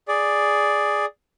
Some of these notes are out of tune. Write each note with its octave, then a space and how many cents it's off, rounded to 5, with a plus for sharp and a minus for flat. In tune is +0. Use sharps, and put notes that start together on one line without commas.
G#4 +0 D5 +0